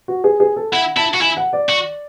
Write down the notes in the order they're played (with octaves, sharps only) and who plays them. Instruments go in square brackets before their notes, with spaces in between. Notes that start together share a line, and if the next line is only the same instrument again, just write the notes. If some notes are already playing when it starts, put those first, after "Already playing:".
[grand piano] F#4
G#4
G#4
A4
[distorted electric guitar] E4 [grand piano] F#5
[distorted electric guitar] E4 [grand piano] A5
[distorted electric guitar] F#4
[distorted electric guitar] E4 [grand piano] G#5
[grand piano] F#5
D5
[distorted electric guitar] F#4